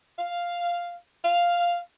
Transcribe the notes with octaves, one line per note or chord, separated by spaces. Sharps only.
F5
F5